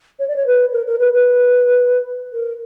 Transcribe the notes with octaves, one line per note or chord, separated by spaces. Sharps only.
C#5
D5
C#5
B4
A#4
A#4
B4
B4
A#4